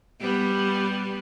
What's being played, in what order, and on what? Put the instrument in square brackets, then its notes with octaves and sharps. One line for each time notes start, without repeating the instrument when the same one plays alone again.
[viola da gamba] G3 B3